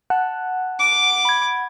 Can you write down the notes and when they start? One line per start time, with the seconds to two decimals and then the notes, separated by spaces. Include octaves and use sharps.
0.10 F#5 A5 F#6
0.79 D6
1.25 B5 G#6